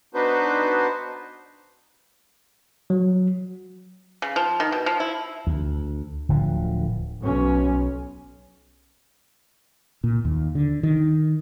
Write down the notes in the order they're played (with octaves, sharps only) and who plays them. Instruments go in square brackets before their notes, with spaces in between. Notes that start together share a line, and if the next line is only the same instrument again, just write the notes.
[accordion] B3 D4 D#4 F#4 B4 C5
[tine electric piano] F#3
[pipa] C#3
F3
D#3
B2
F3
E4
[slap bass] D2
D1 D3 F3
[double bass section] B1 C#4
[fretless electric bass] A#2
D#2
D3
D#3